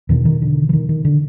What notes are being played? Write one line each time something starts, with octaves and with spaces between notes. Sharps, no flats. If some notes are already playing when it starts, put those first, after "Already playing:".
E2 B2 D#3
D#3
D3
E3
D#3
D#3
D3